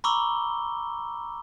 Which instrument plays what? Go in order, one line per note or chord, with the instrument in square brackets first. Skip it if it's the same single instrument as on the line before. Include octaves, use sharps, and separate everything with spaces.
[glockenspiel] A#5 B5 C#6 D6 E6 G7